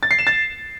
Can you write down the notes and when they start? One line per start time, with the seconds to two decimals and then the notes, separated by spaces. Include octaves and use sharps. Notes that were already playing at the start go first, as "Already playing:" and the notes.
0.03 A6
0.11 C7
0.19 E7
0.27 A6